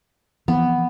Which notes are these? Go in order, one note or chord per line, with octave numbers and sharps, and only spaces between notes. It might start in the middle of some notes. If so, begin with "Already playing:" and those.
E3 F3 B3 C4